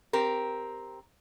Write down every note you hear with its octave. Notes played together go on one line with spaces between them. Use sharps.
C4 G4 A#4